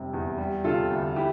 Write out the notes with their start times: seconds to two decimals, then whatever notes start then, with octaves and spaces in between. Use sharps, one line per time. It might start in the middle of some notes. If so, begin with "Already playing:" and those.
Already playing: F1 C3 G3
0.13 E2
0.38 G3
0.64 C3 F4 A4
0.91 D2
1.16 E3 E4 G4